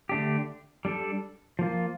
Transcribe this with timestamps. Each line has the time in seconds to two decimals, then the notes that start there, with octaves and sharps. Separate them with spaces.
0.09 D3 A3 D4 G4
0.85 G3 D4 A4
1.59 F3 A#3 F4